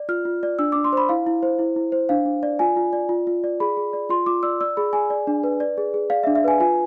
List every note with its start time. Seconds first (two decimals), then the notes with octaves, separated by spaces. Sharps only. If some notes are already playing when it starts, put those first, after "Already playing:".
Already playing: D5
0.09 F4 F6
0.25 F4
0.43 D5
0.59 D4 E6
0.72 D6
0.75 D4
0.84 C6
0.93 C5 B5
1.09 E4 F5
1.27 E4
1.43 C5
1.59 E4
1.76 E4
1.92 C5
2.09 D4 F5
2.26 D4
2.43 D5
2.59 F4 G#5
2.76 F4
2.93 D5
3.09 F4
3.27 F4
3.44 D5
3.60 G#4 B5
3.77 G#4
3.93 D5
4.09 F4 C6
4.26 F4 D6
4.43 D5 E6
4.61 D5 E6
4.77 G#4 B5
4.93 G#4 G#5
5.10 D5
5.27 D4
5.44 B4
5.60 D5
5.78 G#4
5.94 G#4
6.10 D5 F5
6.23 E5
6.27 D4
6.35 E5
6.44 B4 G#5
6.60 F4 G#5